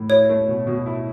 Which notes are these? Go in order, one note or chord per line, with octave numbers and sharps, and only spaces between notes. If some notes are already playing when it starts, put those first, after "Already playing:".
Already playing: A2
E4 C#5
A3
B2
B2
E4